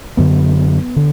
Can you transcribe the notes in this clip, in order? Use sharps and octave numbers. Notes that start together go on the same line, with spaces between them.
F#2 D3 B3
D3